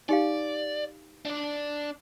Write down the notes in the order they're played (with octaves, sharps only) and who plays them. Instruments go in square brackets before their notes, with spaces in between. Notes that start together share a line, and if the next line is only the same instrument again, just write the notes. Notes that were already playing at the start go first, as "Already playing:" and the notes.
[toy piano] D#4 G4 F5 [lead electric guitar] D5
[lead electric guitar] D4 D5